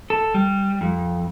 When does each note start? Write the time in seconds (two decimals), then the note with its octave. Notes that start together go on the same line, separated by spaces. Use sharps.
0.10 A4
0.34 G3
0.81 F2